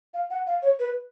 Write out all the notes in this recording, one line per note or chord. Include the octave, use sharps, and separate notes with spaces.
F5
F#5
F5
C#5
B4